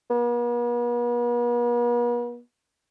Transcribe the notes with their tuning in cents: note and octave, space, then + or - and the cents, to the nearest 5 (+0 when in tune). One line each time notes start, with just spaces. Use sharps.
B3 -45